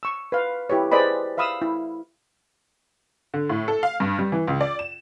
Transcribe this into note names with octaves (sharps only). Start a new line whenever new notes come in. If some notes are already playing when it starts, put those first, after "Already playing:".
C#6 E6
B4 F5
E4 G4 B4 C#5
G#4 B4 C5 D5 D#5 B5
E5 F5 B5 D#6 E6
E4
D3
A2
A4
F5
G2
G3
E3
C#2
D5
E7